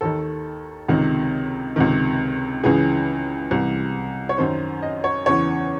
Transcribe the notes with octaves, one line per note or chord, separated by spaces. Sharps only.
D#2 D#3 A4
C#2 C3 D#3
C#2 C3 D#3
C#2 C#3 E3 G#4
C2 C3 E3
C#5
F#2 D#3 C5
D#5
C#5
E2 C#3 E3 C#5